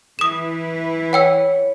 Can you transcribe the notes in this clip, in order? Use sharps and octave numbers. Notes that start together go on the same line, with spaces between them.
E3 E4 B4 D#6 E7
C#5 F#5 G5 E6